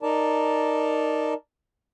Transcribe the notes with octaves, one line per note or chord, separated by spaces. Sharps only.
D#4 A#4 D5 A5